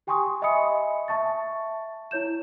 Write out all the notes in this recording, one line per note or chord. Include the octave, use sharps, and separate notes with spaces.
G4 G5 G#5 C6 C#6 D#6
D#5 E5 G#5 B5 D#6 C#7
E5 A5 C#6 A6
E4 C#5 G6 E7